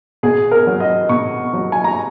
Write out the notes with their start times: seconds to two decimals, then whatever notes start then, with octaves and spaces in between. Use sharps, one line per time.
0.23 B2 G#4
0.51 A#4
0.67 F#3
0.80 D#5
1.09 B2 C#6
1.53 F#3
1.72 G#5
1.84 A#5